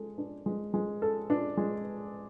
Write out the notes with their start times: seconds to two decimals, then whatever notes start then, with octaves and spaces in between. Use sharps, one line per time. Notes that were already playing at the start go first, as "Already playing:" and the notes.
Already playing: G#3 A4
0.18 D4
0.46 G#3
0.74 G#3
1.02 A4
1.30 D4
1.57 G#3